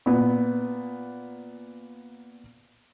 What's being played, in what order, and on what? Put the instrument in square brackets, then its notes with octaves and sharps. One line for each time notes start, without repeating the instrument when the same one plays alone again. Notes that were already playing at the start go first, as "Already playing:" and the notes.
[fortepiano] A#2 B3